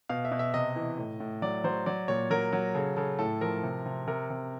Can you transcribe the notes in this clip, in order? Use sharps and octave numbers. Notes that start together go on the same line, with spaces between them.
B2 F5
E5
B2
E5
C3 D#5
E3
A2
A2
F#3 D5
F#3 C5
F#3 D5
A#2 C#5
F#3 A#4
F#3
C#3 A4
C#3 A4
A2 A4
F3 A#4
C3
C3
C3 A#4
C3